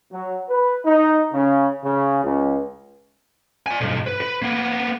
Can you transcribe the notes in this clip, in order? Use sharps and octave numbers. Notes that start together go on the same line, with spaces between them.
F#3
B4
D#4
C#3
C#3
C#2
D5 G#5
B1 G2
B4
B4
A#3 B3